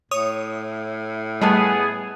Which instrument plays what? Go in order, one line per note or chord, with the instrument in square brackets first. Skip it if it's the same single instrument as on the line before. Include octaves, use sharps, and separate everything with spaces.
[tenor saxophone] A2 [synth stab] C#5 D#6
[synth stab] G3 A3 [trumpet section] B3 G#4 [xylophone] D#5 A5 F#6